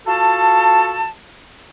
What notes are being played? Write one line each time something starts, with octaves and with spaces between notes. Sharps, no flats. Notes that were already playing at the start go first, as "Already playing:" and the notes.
F4 F#4 A4 A5